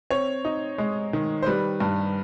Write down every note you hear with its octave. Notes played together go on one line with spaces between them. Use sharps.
C4 C#5
D#4
G#3
D#3
C5
G3 B4
G2